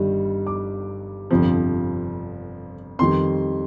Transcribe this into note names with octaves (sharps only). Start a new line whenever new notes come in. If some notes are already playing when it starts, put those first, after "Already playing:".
Already playing: G1 G2 D#3 G3
D6
G1 F2 C3 F3
F2 D#3 G3 C6